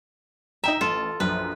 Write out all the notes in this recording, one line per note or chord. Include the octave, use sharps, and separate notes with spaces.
D#4 E5 G5 A#5
A1 F4 A4
A#1 F#2 B4